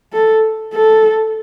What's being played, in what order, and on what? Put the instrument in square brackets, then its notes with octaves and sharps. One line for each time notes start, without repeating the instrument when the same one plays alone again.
[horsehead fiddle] A4
A4